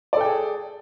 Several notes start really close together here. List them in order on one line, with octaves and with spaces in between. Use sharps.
D5 A4 G5 G#4